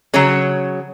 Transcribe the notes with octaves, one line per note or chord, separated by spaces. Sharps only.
C#3 F#3 C#5